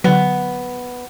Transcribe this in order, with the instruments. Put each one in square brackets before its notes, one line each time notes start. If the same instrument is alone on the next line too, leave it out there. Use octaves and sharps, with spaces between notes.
[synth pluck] D3 F#3 [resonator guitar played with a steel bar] B3